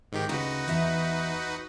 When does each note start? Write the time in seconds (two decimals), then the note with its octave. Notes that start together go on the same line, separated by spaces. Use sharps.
0.12 G#2 D#3 G4
0.29 D2 C#3 D#4 F#4 B4
0.68 E2 E5 A#5